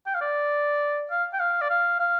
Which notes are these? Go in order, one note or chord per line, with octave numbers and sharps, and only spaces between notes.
G5
F5
D5
F5
G5
F5
D5
F5
F5